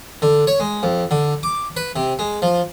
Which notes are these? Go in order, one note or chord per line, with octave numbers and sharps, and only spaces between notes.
D3
C#5
G#3
F2
D3
D6
B4
C3
G#3
F3